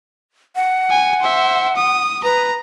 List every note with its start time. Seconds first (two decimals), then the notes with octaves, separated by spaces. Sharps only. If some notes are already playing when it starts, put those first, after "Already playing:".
0.56 F#5
0.90 G#5
1.22 C5 E5
1.76 D#6
2.24 B4 A#5